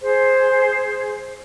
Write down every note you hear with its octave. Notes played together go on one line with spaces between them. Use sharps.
G#4 C5